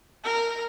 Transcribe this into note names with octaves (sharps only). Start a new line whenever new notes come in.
A#4